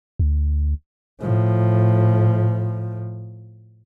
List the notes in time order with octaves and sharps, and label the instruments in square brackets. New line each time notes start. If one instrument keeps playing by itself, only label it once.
[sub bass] D2
[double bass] A2 F3